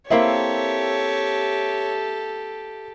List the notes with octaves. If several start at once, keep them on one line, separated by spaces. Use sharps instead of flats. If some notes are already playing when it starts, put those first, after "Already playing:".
A#3 C4 E4 G4 A4 C#5 E5